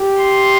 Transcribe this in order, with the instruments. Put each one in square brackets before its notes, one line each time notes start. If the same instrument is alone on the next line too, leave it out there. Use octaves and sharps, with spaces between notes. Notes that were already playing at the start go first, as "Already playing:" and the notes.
Already playing: [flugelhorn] G4
[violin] C6